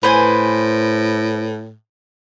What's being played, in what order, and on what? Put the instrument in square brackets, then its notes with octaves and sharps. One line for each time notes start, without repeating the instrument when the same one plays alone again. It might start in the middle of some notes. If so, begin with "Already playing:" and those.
[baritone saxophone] A2 [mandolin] B4 C5 G#5